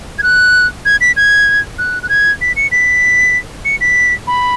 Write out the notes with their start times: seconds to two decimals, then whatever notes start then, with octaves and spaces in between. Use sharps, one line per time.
0.19 G#6
0.23 F#6
0.85 G#6
1.01 B6
1.17 G#6
1.79 F#6
2.03 F#6
2.09 G#6
2.41 B6
2.56 C#7
2.72 B6
3.65 C#7
3.81 B6
4.27 B5